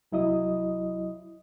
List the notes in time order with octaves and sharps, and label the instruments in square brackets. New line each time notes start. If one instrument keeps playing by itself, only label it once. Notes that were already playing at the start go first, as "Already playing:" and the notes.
[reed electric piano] C2 F#3 E4 D#5 D#6